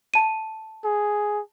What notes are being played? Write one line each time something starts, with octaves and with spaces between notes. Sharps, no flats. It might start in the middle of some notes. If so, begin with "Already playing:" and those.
A5 D#7
G#4